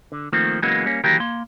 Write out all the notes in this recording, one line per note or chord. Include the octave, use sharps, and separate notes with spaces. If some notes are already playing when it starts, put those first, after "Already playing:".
D3
D#3 F3 A3 A#3 C4
C#3 E3 F#3 G#3 A#3 B3
G3 A#3 C#4
D#3 E3 F#3 A#3 G4 A#4
A#3 C6